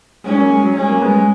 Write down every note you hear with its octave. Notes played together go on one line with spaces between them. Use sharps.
G#3 C#4
F#3 A#3
G#3
F#3
G#3 C#4
F#3 A#3
G#3 B3
G#3